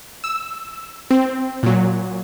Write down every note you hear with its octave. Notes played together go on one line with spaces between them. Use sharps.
E6
C4
A#2 F#3